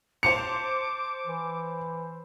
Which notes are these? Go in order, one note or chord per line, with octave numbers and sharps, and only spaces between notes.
C5 A5 D6 C#7 F7
E3